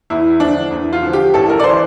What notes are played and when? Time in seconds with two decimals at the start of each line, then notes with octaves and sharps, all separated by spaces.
0.10 E2 E4
0.40 D3 F3 D4
0.71 E2
0.93 F4
1.03 D3 F3
1.13 G4
1.34 A1 A4
1.49 A#4
1.60 D5
1.64 E3 C5